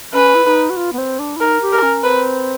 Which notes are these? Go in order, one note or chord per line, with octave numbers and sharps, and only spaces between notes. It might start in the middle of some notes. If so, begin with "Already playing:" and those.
C#4 B4
E4
D#4
F#4
F4
B3
C4
D4
E4
D#4 A#4
G4
A#4
C#4
C4 B4